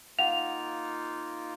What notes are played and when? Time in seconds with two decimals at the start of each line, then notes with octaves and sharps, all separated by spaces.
0.19 A#3 D#4 F4 F5 F#5 F7